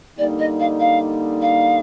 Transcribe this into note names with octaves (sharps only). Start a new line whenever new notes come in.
D3 G3 A#3 D#4 D5
D#5
F5
F5
F5